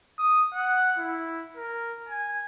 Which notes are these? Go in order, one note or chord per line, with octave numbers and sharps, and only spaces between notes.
D#6
F#5
E4
A#4
G#5